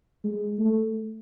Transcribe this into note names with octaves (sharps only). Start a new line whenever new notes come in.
G#3
A3